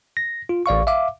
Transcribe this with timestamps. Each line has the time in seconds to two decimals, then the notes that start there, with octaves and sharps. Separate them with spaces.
0.17 A#6
0.49 F4
0.66 A1 D5 F5 C#6
0.87 E5 F5 D6